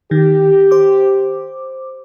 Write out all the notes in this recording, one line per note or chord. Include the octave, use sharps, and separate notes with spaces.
D#3 G4
C5 D6